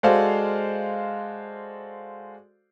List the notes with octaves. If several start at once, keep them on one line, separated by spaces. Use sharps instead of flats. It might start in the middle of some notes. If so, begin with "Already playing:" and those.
G#3 F#4 A4 C5 D5 F5